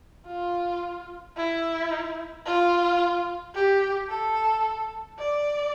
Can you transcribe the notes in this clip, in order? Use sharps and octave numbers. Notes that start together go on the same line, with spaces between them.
F4
E4
F4
G4
A4
D5